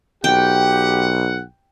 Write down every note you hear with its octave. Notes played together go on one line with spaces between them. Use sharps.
B1 G4 F#5 G5